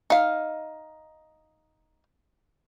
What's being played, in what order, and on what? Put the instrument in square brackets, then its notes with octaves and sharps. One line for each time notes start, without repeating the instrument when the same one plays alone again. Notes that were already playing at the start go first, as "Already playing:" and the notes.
[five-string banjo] D#4 F5